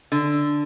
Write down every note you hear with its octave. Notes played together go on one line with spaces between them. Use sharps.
D3